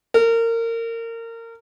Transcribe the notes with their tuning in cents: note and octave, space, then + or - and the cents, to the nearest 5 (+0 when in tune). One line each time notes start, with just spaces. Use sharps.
A#4 -25